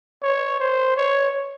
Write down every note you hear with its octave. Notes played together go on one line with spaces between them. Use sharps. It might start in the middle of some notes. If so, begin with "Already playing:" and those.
C#5
C5
C#5